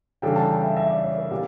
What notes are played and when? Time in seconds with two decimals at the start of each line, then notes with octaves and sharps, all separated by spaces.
0.22 C#3 E3 G3 D4 A4 G5
0.36 A5
0.51 G5
0.63 E5
0.77 E5
0.90 D5
1.04 C#5
1.18 A#4
1.31 A#2 A#3 G4